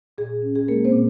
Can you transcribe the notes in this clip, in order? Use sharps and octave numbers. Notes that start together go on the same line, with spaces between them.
A#2 G#4
C#4
G#4
G#3 A#3 A#4
C4 C5
A#2